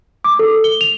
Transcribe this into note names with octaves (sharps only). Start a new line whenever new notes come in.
D6
A4
G7
F7